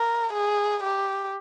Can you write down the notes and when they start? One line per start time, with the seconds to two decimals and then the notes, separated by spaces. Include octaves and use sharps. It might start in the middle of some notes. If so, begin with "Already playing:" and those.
Already playing: A#4
0.33 G#4
0.83 G4